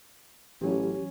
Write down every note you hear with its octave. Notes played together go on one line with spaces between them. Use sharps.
A1 E3 F#3 C#4 G4